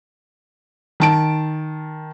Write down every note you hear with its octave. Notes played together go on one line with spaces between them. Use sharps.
D#3 A5 D7